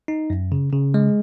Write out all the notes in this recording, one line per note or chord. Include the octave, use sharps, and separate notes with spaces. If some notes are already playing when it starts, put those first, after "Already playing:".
D#4
F#2
C#3
C#3
G#3